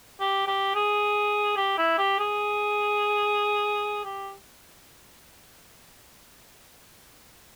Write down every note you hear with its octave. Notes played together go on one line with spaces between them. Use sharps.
G4
G4
G#4
G4
E4
G4
G#4
G4